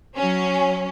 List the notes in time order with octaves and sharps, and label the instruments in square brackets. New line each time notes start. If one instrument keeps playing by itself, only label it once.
[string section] F#3 C#4